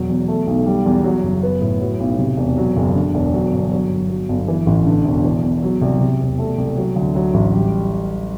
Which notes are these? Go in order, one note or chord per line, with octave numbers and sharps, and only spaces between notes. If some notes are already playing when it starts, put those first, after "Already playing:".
Already playing: E1 F#3
E2
A3
B1
G3
E2
F#3
F#1
B3
A2
F#3
B1
C3
E1
F#3
F#1
D3
E1
F#3
G1
F#3
G1
F#3
G1
E3
A1
D3
E1
E3
E2
F#3
C2
C3
E1
A3
C2
F#3
D2
F#3
A1
G3